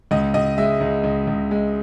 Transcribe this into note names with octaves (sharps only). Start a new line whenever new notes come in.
C#2 D#5
C#2 D#5
G#3 E5
C#2
C#2
C#2
G#3